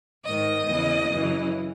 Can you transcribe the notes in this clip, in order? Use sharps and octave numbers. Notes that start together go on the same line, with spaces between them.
G#2 D#3 D#5
E2 C#3 E3
F#2 C#3 E3